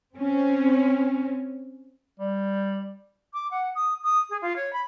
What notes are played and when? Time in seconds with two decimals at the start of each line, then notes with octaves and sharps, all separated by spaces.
0.15 C4 C#4
2.20 G3
3.33 D6
3.51 F#5
3.75 D#6
4.03 D#6
4.29 G#4
4.42 F4
4.56 C#5
4.72 B5